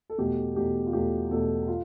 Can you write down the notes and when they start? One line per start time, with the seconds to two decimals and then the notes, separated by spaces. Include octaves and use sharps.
0.10 A4
0.18 E2 B2 A3 G4
0.56 E2 B2 A3 G4
0.86 F4
0.93 E2 B2 A3 G4
1.31 E2 B2 A3 A4
1.68 F4